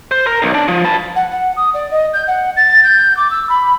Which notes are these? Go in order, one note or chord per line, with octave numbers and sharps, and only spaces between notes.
C5
A#4
B1
D4
F3
B4 A5
F#5
F#5
D#6
D5
D#5
G6
F#5
A6
G6
D6
E6
B5